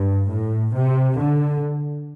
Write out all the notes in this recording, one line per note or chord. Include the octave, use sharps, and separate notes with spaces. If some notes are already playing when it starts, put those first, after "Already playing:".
Already playing: G2
A2
C3
D3